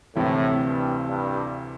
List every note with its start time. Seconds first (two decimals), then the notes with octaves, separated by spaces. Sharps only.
0.15 D2 A2 C3 E3
0.62 G2
1.08 G2